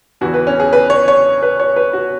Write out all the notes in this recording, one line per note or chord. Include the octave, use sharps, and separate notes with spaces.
E2 E3 F#4
B4
C#4
G#4
B4
C#5
C#5
B4
C#5
B4
F#4